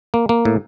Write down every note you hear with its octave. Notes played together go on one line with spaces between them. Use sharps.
A#3
A#3
A2